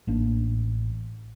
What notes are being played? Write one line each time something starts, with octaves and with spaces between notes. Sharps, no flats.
A1 A#3 D4